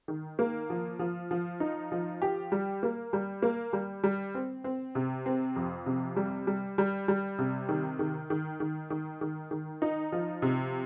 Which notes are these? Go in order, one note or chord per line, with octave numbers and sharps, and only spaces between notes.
D#3
A#3
F3
F3
F3
D#4
F3
G4
G3
A#3
G3
A#3
G3
G3
C4
C4
C3
C4
F2
C3
G3
G3
G3
G3
C3
D#3
D#3
D#3
D#3
D#3
D#3
D#3
D#4
F3
C3